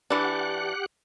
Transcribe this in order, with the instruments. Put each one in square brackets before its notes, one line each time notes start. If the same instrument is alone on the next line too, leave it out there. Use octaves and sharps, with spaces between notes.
[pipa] E3 D4 [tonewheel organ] G4 F#5 F#6